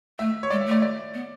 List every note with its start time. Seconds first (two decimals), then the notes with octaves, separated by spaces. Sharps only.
0.19 A3 E5
0.43 C#5
0.50 G#3 D5
0.61 E5
0.66 A3
0.71 D5
0.82 D5
1.14 B3